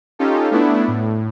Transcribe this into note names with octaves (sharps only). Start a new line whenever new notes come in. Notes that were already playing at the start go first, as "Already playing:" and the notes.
C#4 D#4 F4 G4 A4
A3 B3 D4 E4
A2